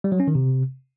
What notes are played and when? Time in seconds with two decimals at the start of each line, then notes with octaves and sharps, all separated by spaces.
0.04 G3
0.12 F#3
0.20 C#4
0.27 D#3
0.35 C3